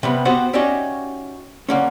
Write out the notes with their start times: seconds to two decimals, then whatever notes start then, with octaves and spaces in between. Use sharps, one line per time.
0.03 C3 G3 B3
0.25 B3 C4 F#4 G4 C5 F#5
0.53 C#4 D#4 F#4 G4 D5 E5
1.69 D3 A#3 C#4